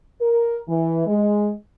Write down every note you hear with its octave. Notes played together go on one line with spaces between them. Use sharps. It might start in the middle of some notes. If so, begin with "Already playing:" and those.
A#4
E3
G#3